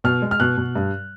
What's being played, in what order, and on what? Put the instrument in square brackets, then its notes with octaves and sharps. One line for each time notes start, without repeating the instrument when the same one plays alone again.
[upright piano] B2 F6
G#3
F6
B2 F#6
B2
G2